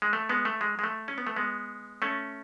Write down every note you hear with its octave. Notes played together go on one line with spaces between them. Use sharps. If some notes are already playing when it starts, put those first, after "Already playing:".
G#3
A3
G#3 B3
A3
G#3
G#3
A3
C#4
B3
A3
G#3 B3
A3 C#4